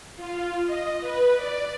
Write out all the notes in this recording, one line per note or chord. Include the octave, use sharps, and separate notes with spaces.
F4
D#5
B4
D5